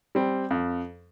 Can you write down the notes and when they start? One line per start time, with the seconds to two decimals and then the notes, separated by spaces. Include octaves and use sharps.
0.15 G3 C4
0.51 F2